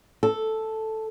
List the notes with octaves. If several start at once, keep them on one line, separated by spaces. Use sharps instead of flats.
A4